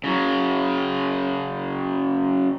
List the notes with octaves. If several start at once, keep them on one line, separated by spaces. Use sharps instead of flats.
C#3 F#3